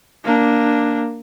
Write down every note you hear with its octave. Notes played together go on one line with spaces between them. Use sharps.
A#3 D4